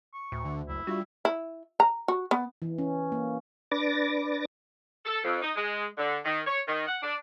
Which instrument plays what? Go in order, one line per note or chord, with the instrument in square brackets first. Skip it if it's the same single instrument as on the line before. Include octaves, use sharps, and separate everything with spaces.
[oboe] C#6
[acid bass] D2 [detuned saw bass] A2
[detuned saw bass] D3 [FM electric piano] D4
[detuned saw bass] F#1 [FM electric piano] C#2 [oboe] E4
[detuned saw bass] G3 [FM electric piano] D4 F4 E5 [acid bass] F#4
[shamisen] E4
A#5
F#4
B3
[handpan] E3
C#4
A#3
[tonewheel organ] D4 B4 D6 A6 A#6
[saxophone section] A4
F2
D#4
G#3
D3
D#3
C#5
D#3
F#5
D4